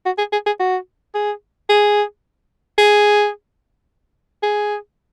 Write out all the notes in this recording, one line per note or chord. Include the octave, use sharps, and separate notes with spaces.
F#4
G#4
G#4
G#4
F#4
G#4
G#4
G#4
G#4